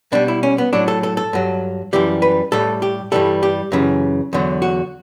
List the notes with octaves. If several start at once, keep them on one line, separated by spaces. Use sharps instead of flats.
B2 G3 D4
E4
C#4
B3
A2 F#3 D4
A4
A4
A4
G2 F#3
F#2 E3 G3 G4
B4
A2 G3 A4
G4
G2 E3 G3 A4
G4
F#2 C#3 E3
E2 D3 F#3
F#4